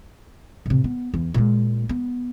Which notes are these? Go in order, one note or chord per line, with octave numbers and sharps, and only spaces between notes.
A2 C3
B3
E2
A#2 G#3
B3